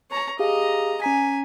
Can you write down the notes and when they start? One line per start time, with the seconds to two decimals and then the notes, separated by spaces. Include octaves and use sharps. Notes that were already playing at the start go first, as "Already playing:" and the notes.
0.11 C#5 A#5
0.39 G4 G#4 D#5 F5 A#5
1.02 C#4 G#5 A#5 B6